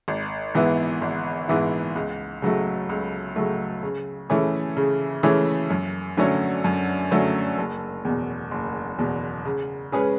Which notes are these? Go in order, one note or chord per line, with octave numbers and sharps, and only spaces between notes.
G#1
G#2 E3 B3 E4
G#1
G#2 E3 B3 E4
C#2
C#3 F#3 A3
C#2
C#3 F#3 A3
C#3
E3 A3 C#4 G#4
C#3
E3 A3 C#4 G#4
F#2
D3 F#3 A3 C#4
F#2
D3 F#3 A3 C#4
F#1
E2 B2
F#1
E2 B2
C#3
G#3 C#4 G#4 B4